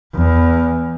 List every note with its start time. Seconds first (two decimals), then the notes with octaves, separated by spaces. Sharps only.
0.14 E2